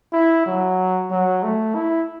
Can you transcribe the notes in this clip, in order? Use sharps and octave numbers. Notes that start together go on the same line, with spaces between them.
E4
F#3
F#3
A3
E4